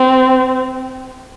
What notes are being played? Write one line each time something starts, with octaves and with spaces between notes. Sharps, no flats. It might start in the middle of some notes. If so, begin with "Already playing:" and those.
Already playing: C4